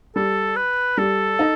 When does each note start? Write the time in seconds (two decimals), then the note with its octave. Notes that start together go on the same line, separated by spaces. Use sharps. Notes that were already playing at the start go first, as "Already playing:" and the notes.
0.15 G3 A4
0.56 B4
0.97 G3 A4
1.39 D#4